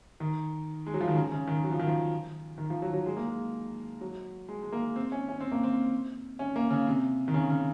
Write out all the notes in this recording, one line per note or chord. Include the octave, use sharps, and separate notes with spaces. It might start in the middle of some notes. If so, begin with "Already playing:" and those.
D#3
G#3
F#3
F3
D#3
C#3
C#3
D#3
F#3
F3
D#3
F3
D#3
F3
F#3
F#3
G#3
A#3
G#3
F#3
G#3
G#3
A#3
C4
C#4
C#4
C4
A#3
C4
C#4
A#3
C#3
C3
D#3
C#3
C#3